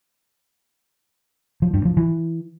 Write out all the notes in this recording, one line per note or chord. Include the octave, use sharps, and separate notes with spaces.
F3
G2
F3
E3